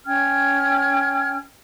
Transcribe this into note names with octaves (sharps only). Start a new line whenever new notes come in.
C#4 G5 F6 G#6